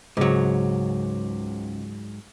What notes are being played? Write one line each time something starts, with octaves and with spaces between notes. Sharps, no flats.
C#2 G#2 F#3 C5 D6